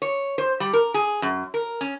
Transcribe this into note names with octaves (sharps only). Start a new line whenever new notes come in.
C#5
C5
G3
A#4
G#4
F#2
A#4
C#4